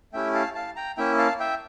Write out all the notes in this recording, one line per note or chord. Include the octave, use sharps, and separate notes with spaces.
A3 C#4 E4 G4 E5 G5
F5 A5
F5 A5
G5 A#5
A#3 C#4 E4 E5 G5
F5 A5
E5 G5